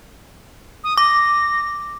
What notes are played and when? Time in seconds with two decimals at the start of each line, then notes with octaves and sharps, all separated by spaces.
0.84 D#6
0.98 D6 A#6